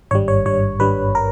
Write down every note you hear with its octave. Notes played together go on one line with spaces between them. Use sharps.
G#1 G2 G3 C#5
C#5
G#1 G2 G3 C#5
G#1 G2 G3 B4
A#4